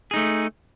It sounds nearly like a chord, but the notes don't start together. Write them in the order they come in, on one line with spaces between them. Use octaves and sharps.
G#4 D#4 A3